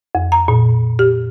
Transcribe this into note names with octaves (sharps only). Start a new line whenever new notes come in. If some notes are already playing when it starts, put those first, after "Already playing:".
F2
A#5
A#2
G4